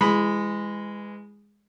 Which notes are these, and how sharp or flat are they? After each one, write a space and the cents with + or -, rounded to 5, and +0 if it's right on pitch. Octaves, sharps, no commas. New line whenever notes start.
E3 +20 G#3 -10 B5 +0